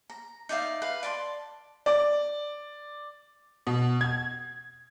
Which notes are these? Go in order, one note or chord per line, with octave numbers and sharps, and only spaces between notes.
A#5
D#4 D5 E5 F5
B4 F5
D5 A5 C6
D5
B2
G#6